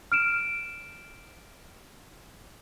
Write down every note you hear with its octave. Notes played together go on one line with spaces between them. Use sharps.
F6 D7 E7